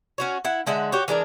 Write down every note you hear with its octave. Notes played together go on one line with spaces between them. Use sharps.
C#4 F#4 C#5
E4 F#5
D3 G#3 E5 F#5
F#4 G4 C#5
E3 G#3 D4 A#4